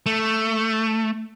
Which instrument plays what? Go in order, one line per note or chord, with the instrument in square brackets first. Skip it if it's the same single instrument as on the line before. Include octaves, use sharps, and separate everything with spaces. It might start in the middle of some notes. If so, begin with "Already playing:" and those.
[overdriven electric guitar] A3